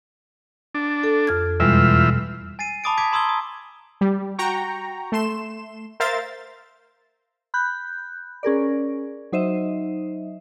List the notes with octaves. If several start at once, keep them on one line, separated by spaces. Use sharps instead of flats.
D4
A4
F2 F6 G#6
E2 B2 G3 G#3 F4 E5
G#5 A6 C7 D#7
A5 B5 D6 D#6 A6 D7
D6 D#6 G#6 B6 D7
A#5 C6 D#6 E6 G#6 G7
D#6
G3
F#4 G5 A#5 C#6
A3 C6 E7
A#4 C5 E5 F5 A6
B5 F#6 G6
C#4 G#4 A#4 D5
F#3 D#4 C5 D#5 E5